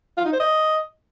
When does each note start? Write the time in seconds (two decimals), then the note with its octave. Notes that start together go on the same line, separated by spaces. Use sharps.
0.18 F4
0.25 D#4
0.33 C5
0.40 D#5